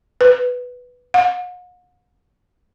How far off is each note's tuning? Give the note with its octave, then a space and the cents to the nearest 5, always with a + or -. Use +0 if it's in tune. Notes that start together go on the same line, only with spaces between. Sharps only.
B4 +0
F#5 -45